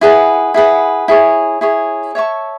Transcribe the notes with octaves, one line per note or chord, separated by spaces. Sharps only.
E4 G#4 B4 F#5
E4 G#4 B4 F#5
E4 G#4 C#5
E4 G#4 C#5
C#5 E5 A5 C#6